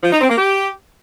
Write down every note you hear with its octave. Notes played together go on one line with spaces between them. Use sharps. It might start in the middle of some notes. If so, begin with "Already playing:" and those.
F3
D#4
C4
A#3
G4